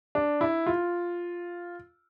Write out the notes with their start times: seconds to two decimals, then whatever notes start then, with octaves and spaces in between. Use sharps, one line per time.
0.15 D4
0.41 E4
0.67 F4